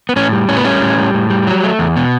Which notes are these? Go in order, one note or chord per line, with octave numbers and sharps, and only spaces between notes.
B3
A2 C#4
G3
A2 C#4
B3
G3 C#4
A2
G3
A2
G3
F#3
A3
E2
B2